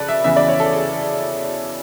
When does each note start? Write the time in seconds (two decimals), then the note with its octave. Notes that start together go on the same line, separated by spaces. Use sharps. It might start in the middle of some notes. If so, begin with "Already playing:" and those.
Already playing: C#3 C#4 A4 B4 D5
0.08 E5
0.24 E2 C#3 E3 E5
0.36 D5
0.49 C#5
0.60 A4
0.73 G#4